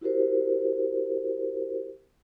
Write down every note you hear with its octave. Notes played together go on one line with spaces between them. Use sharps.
E4 F#4 G4 A#4 C5